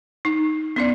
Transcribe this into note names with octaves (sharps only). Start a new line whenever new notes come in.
D#4
B3 C#4 D5